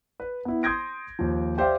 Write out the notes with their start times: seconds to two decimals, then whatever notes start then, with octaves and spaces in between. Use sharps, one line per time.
0.20 B4
0.45 B3 E4
0.63 C6 D#6 G6 G#6 A#6 D7
1.19 D#2 F3
1.58 G4 C5 D5 E5 F5 G5